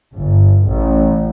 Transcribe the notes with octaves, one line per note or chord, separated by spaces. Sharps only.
G1
A1